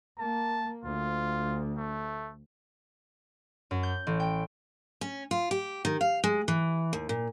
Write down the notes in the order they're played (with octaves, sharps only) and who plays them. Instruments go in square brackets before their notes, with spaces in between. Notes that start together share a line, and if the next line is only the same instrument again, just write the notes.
[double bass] A#3 [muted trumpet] A5
[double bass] D2 [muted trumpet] F4
[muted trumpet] A3
[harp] F#2
G6
A1
G5
[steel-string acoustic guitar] C#4
F4
G4
D#3
F5
G#3
E3
D#2
A#2